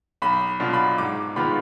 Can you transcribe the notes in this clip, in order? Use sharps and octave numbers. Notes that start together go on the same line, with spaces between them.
B1 B5
B2 F#3 D4 F4
B5
G#2 D6
D#3 G#3 B3 F4 B5